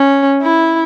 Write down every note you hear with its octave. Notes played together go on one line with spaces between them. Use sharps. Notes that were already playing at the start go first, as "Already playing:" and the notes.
Already playing: C#4
E4